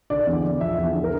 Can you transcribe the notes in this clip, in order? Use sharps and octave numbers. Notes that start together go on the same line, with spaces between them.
D3 D5
E2
E2
F3 E5
E2
D3
A#4